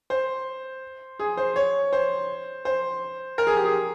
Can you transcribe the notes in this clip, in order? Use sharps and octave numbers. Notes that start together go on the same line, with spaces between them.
C5
G#4
C5
C#5
C5
C5
A#4
G#4
G4
G#4